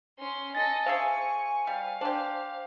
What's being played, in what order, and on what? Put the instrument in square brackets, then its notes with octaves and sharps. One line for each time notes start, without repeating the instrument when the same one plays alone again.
[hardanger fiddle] C#4 C6
[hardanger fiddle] A4 D#5 [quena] G#5 [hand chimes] A6 A#6
[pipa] G#4 E5 F5 [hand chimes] C5 [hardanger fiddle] C#6
[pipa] G3 [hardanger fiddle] F5
[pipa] D4 G4 [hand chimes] C5